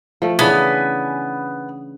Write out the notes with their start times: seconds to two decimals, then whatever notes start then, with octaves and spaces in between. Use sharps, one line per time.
0.22 F3 A3
0.39 C#3 E3 B3 D4 G#5 B5